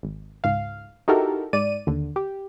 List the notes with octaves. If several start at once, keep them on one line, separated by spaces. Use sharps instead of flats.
G#1
C#2 G#2 F5
D#4 E4 F#4 G4 A4 A#4
G#2 D5 D#7
D#2 D3
G4